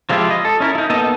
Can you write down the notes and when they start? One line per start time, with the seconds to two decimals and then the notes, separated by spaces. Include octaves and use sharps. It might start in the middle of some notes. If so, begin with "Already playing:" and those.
0.10 F3 F#3 G#3 E4 F4 G4
0.30 D#5
0.45 A4
0.60 C#4 E4 A#4
0.75 D#4 E4
0.90 A#3 B3 D#4 A4 D#5